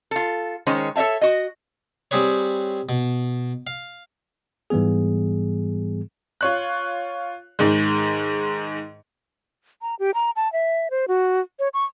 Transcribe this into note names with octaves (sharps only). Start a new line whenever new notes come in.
F4 A4
D#3 G#3 C#4 C5
A4 C#5 D#5 E5 A5
F#4 D#5
G3 C4 G#4 B4 C#5
B2
F5
G#2 E3 G3 B3 G#4
F4 C#5 F#6
G#2 D#3 G#3
A#5
G4
A#5
A5
E5
C5
F#4
C#5
C#6